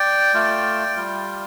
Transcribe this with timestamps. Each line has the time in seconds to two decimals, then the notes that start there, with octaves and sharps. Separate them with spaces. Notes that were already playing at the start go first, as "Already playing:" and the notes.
Already playing: D5 G5
0.34 A3 F4
0.96 G3 F4